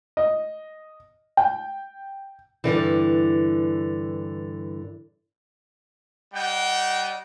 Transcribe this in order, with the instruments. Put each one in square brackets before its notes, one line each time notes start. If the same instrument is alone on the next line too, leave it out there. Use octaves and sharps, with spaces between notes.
[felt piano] D#5
G5
[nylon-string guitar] G2 B2 D3 E3
[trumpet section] G3 D#5 F#5 G5